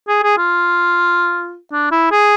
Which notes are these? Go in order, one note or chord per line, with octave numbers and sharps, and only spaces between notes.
G#4
G#4
F4
D4
E4
G#4